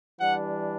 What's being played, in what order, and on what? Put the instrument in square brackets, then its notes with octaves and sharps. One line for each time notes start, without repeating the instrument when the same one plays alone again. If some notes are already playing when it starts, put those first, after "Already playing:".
[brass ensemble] E3 G3 D4 F#5